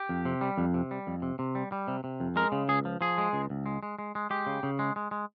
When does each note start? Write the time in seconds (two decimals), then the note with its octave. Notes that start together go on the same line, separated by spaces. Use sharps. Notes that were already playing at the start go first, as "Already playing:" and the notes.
Already playing: G4
0.09 F2
0.25 C3
0.41 G3
0.58 F2
0.74 C3
0.91 G3
1.07 F2
1.22 C3
1.39 C3
1.55 G3
1.72 G3
1.88 C3
2.04 C3
2.20 F2
2.36 G#3 A#4
2.52 C#3
2.69 C#2 G#4
2.85 F3
3.01 F3 G#4
3.18 G#3
3.33 C#2
3.50 C#2
3.66 G#3
3.83 G#3
3.99 G#3
4.15 G#3
4.30 G#3 G4
4.47 C#3
4.63 C#3
4.79 G#3
4.96 G#3
5.11 G#3